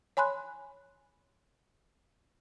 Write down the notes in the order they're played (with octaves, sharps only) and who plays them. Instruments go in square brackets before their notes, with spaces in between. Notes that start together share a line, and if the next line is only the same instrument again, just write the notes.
[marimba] C#5 G#5 B5 C6 F#6